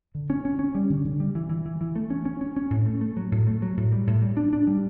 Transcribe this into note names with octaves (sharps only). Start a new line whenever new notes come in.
D3
C#4
C#4
C#4
G3
D3
D3
G3
E3
E3
E3
E3
A3
C#4
C#4
C#4
C#4
A2
A3
A3
F#3
A2
A3
F#3
A2
G3
A2
G3
D4
D4
G3